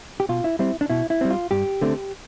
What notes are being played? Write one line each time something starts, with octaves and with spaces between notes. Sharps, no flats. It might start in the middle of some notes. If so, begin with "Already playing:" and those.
G4
B2 F4
E4
G3 C4 E4
D4
B2 E4
E4
G3 C4
F4
G2 G4
D3 A3 C4